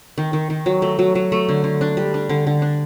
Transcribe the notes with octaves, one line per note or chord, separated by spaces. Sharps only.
D#3
D#3
D#3
F#3
A3
F#3
F#3
A3
D3
D3
D4
G3
D4
D3
D3
D4